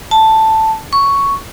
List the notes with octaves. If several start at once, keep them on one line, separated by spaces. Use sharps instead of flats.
A5
C#6